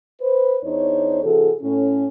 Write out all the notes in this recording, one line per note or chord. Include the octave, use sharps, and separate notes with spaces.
B4 C5
E2 D4 D#4 C5 C#5
C3 E3 F#4 G#4 A4
A2 C#4